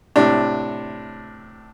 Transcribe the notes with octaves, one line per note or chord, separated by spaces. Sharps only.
A2 C3 D4